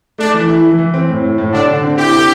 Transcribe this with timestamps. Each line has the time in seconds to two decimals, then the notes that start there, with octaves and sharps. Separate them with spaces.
0.18 A3 D4
0.34 E3
0.49 E4
0.64 E3
0.79 E3
0.94 C4
1.09 A2
1.24 A2
1.38 A2
1.53 D3 D4
1.68 D3
1.83 C4
1.98 E4 G4
2.13 D3